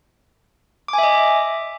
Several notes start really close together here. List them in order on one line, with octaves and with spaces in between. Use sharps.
D6 G#5 E5 D#5